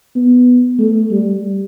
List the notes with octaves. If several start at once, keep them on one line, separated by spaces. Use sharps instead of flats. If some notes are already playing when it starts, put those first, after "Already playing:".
B3
A3
G3